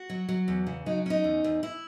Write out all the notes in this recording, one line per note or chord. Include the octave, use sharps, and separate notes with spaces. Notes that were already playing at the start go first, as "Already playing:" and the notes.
Already playing: F#4
F#3
F#3
E2
C#3
F#3 D#4
C#4 D#4
E2
E2
E4